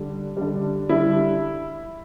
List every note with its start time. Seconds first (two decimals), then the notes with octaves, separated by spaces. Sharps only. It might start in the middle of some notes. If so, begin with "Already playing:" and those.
Already playing: D3 G3
0.37 D3 G3
0.89 D3 G3 E4